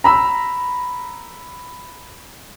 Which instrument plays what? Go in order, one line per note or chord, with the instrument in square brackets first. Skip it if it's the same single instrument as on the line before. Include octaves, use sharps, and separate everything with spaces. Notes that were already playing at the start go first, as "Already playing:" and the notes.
[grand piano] A#5 B5 E6